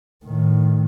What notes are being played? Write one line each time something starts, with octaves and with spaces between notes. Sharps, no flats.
A2 D#3